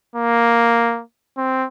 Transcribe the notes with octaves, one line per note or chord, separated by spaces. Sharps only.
A#3
C4